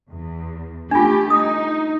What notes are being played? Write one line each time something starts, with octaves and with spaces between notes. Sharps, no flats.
E2
A3 D4 F4 G4
D#4 D#6